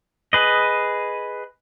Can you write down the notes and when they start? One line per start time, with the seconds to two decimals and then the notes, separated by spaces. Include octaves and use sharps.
0.33 G#4 B4 D#5